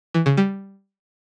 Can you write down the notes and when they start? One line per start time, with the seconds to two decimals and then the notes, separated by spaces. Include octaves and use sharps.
0.14 E3
0.26 C#3
0.37 G3